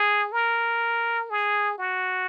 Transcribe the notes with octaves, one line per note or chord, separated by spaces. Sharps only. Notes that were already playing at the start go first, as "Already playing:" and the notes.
Already playing: G#4
A#4
G#4
F#4